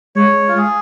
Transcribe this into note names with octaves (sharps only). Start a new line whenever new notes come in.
G#3 C#5
F4
G#4